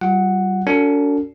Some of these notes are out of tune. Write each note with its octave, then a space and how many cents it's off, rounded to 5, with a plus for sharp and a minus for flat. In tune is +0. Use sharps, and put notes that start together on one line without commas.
G3 -35 F4 +0 F#5 +0
D4 -45 F#4 +0 A4 +40